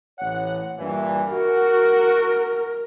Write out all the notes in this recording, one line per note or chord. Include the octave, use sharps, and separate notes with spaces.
A1 C#5 F#5
G2 A#2 E3
F#4 A#4